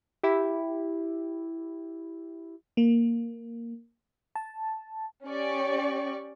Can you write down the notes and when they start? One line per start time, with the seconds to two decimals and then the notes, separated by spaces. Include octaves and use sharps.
0.23 E4 G4
2.77 A#3
4.35 A5
5.25 C#4 G4 D5 C#6